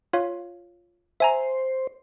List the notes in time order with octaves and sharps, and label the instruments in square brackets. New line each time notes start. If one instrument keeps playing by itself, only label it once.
[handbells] F4 C#5 F5
[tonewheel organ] C5 [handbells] E5 G#5 A#5